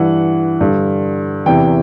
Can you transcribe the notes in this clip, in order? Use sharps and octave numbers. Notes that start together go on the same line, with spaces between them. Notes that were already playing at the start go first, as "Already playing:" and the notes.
Already playing: G2 E3 F#5
G2 D3
E2 C3 E3 G5